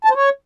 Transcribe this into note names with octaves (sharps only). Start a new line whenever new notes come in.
A5
C5
C#5